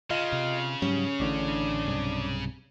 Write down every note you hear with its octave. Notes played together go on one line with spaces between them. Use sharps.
C#3 F4 D#5
C3
G#2 F#3 G3 C#4
A1 A2 D3 D4
B1 G2 C3